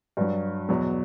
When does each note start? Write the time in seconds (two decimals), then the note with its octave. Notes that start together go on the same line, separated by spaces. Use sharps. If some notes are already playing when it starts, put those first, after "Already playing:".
0.17 G2 F#3
0.69 E2 B2 F#3